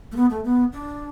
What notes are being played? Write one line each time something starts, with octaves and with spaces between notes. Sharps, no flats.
A3
B3
A3
B3
D4